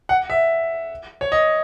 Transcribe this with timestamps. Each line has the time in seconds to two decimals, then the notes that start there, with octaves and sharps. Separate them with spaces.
0.09 F#5
0.30 E5
1.21 C#5
1.32 D#5